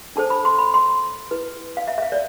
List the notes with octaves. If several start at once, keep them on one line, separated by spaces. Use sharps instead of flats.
D4 A4 C5 A5
B5
C6
B5
C6
E4 B4
F5
E5
E5
F5
D5